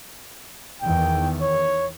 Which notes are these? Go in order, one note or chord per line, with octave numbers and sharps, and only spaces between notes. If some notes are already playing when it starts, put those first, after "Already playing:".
E2 D#3 G5
C#5